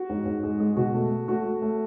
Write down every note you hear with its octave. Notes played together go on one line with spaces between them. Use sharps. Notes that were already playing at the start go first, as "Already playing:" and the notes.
Already playing: F#4
G#2
G#2
G#3
G#3
B2 F#4
A3
A3
A3 F#4
A3
A3